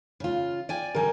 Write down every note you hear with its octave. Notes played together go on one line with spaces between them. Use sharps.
C#3 F4
D5 G5 G#5
D3 G3 A#4 G#5